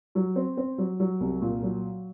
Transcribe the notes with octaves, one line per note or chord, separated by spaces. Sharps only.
F#3
C4
C4
F#3
F#3
C2
A#2
F#3